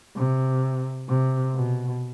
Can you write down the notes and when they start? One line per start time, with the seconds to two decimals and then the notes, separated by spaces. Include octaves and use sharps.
0.16 C3
1.09 C3
1.55 B2